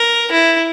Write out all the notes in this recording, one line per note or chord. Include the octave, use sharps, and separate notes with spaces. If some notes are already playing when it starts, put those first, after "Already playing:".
Already playing: A#4
E4